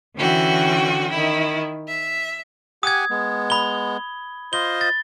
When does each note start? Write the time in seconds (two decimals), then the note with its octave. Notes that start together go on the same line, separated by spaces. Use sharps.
0.16 D3 E3 C#4 F#4 G5
1.10 D#3 E4
1.86 E5
2.83 G4 F#5 G#5 D#6 G#6
3.10 G#3 B3
3.50 B5 G7
4.53 F4 C5 D#5 G7
4.81 A6